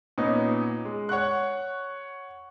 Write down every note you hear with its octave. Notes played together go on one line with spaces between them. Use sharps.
A#2 B3 C#4 D#4
G#3
C#5 F#5 C#6 F#6